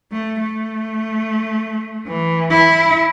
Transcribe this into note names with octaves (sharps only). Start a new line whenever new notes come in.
A3
A3
E3
E4